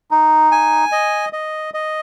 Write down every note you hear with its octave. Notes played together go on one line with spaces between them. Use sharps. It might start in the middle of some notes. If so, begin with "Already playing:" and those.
D#4
G#5
D#5
D#5
D#5